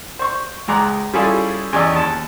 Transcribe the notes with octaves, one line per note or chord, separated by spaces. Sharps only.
C5 C#6
C#2 G#3 A#5 D6 F#6
G3 C#4 E4 F4 G#4 A4
E2 C#4 G4 D5 D#5 E6
D#2 A5